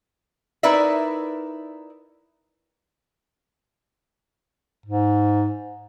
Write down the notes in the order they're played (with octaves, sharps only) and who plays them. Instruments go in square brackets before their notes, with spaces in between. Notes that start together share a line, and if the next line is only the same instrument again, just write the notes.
[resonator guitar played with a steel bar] D#4 E4 A#4 B4 D5 E5
[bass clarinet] G#2